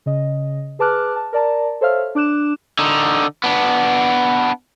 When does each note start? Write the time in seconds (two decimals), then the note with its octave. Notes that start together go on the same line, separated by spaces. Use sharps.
0.06 C#3 D#5
0.79 G#4 B4 A5 D6 F6 F#6
1.16 A5
1.33 A#4 D5 A5 A#5
1.81 A4 C5 C#5 E5 F5 F6
2.15 D4 D6 F#6 E7
2.79 D3 D#4
3.44 B3 D4